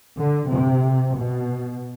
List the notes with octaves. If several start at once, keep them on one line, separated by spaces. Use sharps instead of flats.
D3
C3
B2